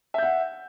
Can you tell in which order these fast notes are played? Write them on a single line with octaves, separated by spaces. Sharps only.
E5 G6 F#5